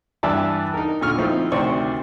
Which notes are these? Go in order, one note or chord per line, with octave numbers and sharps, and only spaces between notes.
G2 E3 E4 D5 E5 A5
D#4 A#4
A#2 D3 C#6 F6
F3 C4 D#4 E4
D2 C3 D#3 C5 D5 C#6